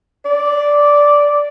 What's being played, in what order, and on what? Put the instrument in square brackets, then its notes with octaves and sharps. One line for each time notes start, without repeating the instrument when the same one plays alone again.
[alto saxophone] D5